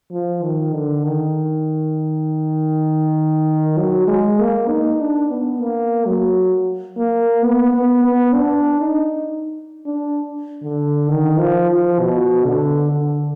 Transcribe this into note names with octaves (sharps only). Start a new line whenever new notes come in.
F3
D#3
D3
D#3
F#3
G#3
A#3
D#4
D4
B3
A#3
F#3
A#3
B3
B3
B3
D4
D#4
D4
D3
D#3
F3
F3
B2
D3
D3